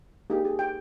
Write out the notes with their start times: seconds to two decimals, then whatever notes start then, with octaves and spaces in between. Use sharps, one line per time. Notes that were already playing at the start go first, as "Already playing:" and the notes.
0.30 A#3 D#4 G4 G#4
0.45 G#4
0.59 G5